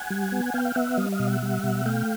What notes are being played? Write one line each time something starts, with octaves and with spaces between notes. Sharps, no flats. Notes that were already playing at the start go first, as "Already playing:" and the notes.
Already playing: F#5 G#5
G3
B3
F#5
B3 F5 G5
F5
B3 E5 F#5
G3 D#5 F5
D#5 F5
B2
E5 F#5
G3
B2
A3 F5 G5